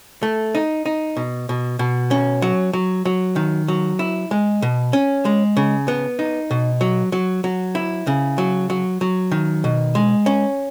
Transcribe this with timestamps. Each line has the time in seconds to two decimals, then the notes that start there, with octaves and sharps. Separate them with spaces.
0.23 A3
0.55 D#4
0.86 D#4
1.17 B2
1.49 B2
1.79 B2
2.11 C#4
2.42 F#3
2.73 F#3
3.05 F#3
3.36 D#3
3.68 F#3
3.99 E4
4.31 G#3
4.62 B2
4.93 C#4
5.25 G#3
5.57 C#3
5.88 B3
6.19 D#4
6.51 B2
6.81 F#3
7.12 F#3
7.44 F#3
7.75 E4
8.07 C#3
8.38 F#3
8.70 F#3
9.01 F#3
9.32 D#3
9.64 B2
9.95 G#3
10.26 C#4